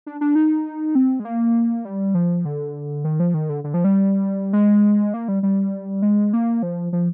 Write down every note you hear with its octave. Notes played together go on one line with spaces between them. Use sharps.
D4
D4
D#4
C4
G#3
A#3
G3
F3
D3
D#3
F3
D#3
D3
D3
F3
G3
G#3
A#3
G3
G3
G#3
A#3
F3
F3